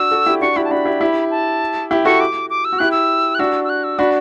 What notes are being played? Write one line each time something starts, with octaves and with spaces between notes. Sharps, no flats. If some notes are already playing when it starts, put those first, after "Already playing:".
Already playing: D4 F#4 E6
F#4 A4
E4 G4
D4 F#4 C#6
E4 G4 B5
A5
D4 F#4 B5
E4 G4
E4 G4
A5
E4 G4
F#4 A4 C#6
D6
D6
E6
F#4
E4 G4 F#6
E6
F#6
D4 F#4 E6
E6
F#6
E6
D4 F#4 B5